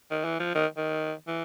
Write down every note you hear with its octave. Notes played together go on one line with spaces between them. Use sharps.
D#3
E3
F3
D#3
D#3
E3